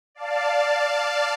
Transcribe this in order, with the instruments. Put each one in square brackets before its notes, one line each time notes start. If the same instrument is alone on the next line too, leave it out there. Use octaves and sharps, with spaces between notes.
[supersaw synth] D5 F5 A5